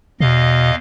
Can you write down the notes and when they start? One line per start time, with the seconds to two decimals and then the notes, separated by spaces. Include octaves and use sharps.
0.20 E2 B2 D#5 F5